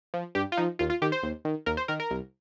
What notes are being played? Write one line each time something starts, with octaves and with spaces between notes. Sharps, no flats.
F3
G2 G4
F4
F3 D#4
D#2 F4
F4
D#3 G4
C5
D#2
D#3
D#2 A#4
C5
D#3 A#4
A#4
C2